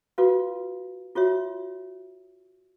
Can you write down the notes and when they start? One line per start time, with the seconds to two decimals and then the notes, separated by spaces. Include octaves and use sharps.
0.18 F4 F#4 B4 F5
1.15 F4 F#4 C#5 E5